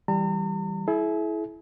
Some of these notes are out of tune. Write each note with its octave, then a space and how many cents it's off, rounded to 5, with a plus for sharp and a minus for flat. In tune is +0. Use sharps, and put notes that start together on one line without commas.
E3 +0 G3 +0 A#5 -45
E4 -5 G#4 +45